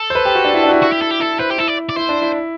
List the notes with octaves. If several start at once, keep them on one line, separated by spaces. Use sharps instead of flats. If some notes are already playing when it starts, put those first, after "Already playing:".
Already playing: A4
C5
B4
G4
F#4
D4
E4
D4
F#4
E4
F#4
G4
A4
G4
E4 A4
B4 C5
G4
E4 A4
D5
D5
E4 C5
D4
E4